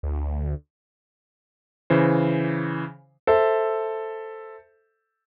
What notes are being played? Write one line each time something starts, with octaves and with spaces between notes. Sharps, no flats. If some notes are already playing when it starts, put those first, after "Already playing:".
D2
C#3 E3 C5
A4 C5 E5